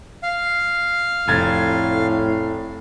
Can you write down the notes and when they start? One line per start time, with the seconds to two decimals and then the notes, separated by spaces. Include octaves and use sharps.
0.23 F5
1.28 F1 A2 G#6 A6